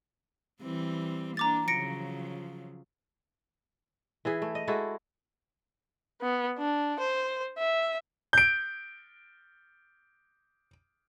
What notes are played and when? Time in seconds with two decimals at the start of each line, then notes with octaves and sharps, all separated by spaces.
0.62 E3 G3 C4
1.37 A#3 D4 A#5 D6 A6
1.68 C#3 F3 F#3 A#6 C#7 D7
4.25 E3 E4 G#4
4.42 A3
4.55 D#5
4.67 G#3 E4 F#4 A4
6.21 B3
6.59 D4
7.00 C5
7.58 E5
8.33 G6 D7